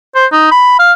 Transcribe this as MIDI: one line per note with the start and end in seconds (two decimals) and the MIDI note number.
0.15 0.26 72
0.32 0.51 63
0.52 0.74 83
0.79 0.93 77